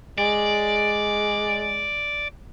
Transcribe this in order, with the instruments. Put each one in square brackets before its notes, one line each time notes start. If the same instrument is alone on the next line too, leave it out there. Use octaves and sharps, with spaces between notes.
[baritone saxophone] G#3 [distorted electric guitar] D5